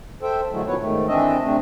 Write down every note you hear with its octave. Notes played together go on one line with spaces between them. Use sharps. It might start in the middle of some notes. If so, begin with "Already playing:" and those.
A4 C5 E5 G5
D3 E3 F#3 G#3 A3
A#2 D#3 F#3 B3 B4 C#5
G#2 D#3 A3
E3 C4 D4 D#5 E5
C3 A3 C4 D4